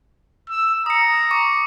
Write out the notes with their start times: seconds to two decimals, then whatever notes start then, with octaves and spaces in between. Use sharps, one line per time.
0.49 E6
0.86 A#5 D#6 C#7
1.31 C#6 D6